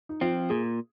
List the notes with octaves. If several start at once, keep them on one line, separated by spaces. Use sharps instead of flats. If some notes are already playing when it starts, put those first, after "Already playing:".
D#4
F3 C4 F4
A#2 G#4